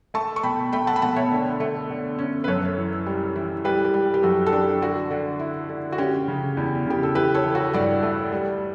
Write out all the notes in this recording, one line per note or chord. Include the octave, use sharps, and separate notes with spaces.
A3 A5 C#6
C#6
B2 G5 B5
A3 G5 B5
F#5 A5
B5
B2 F#5 A5
C#5 E5
D3
A3
D3
C#4
B4
F#2 A4 C#5
E3
G3
E3
G3 G4 B4
G4
G3
G4
F#2 F#4 A4
A4
D4 G4
D3 F#4
D3
E4
D3
F#4
C#4 G4
C#3
E2
C#3 G4
A4
E3 G4 B4
A4 C#5
E3
F#4 A4
G2 D5 F#5
A3
G3